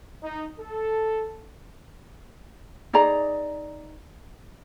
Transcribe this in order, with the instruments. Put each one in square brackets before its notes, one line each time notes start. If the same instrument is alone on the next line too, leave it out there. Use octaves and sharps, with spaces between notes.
[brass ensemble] D#4
A4
[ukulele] D#4 G#4 D5 A#5